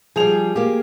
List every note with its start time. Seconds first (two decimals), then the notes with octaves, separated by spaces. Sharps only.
0.16 F3 G3 G#4 F7
0.56 A#3 G4